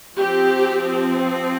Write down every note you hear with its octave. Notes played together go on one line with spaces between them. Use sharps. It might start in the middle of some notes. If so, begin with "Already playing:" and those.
F3 C4 G4